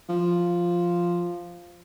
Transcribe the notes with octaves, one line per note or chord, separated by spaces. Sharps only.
F3